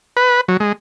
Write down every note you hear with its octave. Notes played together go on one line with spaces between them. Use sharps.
B4
F#3
G#3